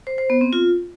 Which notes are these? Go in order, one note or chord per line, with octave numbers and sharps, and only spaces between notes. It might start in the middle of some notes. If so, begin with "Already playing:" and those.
C5
C5
B3
C4
F4